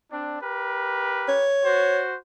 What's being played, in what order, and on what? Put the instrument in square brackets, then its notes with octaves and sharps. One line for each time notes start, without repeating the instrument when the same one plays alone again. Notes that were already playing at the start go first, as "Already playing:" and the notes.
[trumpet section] C4 D4
G4 A#4 B4
[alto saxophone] C#5
[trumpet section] F#4 C5